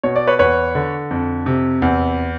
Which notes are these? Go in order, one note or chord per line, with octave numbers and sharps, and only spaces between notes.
B2 C#5
D5
B4 C#5
E2 B4 C#5
D3
F2
C3
E2